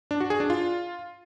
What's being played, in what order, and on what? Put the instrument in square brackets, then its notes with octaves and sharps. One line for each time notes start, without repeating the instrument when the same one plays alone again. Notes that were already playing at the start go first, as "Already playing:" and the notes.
[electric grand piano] D4
F#4
G#4
D4
F4